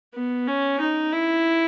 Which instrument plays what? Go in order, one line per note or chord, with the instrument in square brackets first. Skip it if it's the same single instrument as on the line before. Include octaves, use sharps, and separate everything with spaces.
[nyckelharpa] B3
C#4
D#4
E4